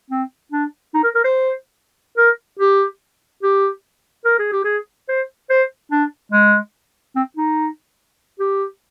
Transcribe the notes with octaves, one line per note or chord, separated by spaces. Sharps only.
C4
D4
D#4
A#4
A#4
C5
A#4
G4
G4
A#4
G#4
G4
G#4
C5
C5
D4
G#3
C4
D#4
G4